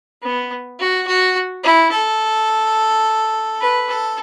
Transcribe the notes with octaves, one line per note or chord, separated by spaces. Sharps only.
B3
F#4
F#4
E4
A4
B4
A4